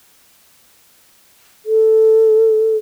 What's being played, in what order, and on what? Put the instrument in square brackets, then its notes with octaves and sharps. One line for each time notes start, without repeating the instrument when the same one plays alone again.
[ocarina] A4